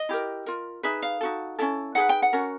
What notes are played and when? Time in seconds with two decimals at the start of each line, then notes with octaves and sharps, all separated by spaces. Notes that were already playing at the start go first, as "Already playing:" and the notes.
Already playing: D#5
0.09 E4 G4 A#4
0.46 F4 A#4
0.83 D#4 G#4 B4 E5
1.02 F5
1.21 D#4 F#4 A4
1.59 C#4 E4 A4
1.95 D#4 G#4 B4 F#5
2.09 G5
2.22 F#5
2.33 C#4 F#4 A#4